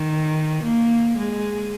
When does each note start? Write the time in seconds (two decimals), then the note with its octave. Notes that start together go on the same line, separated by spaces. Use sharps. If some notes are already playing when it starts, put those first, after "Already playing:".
Already playing: D#3
0.63 A#3
1.17 G#3